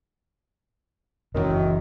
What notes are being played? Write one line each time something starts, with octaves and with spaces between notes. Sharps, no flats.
F#1 F#2 A#2 D#3 E3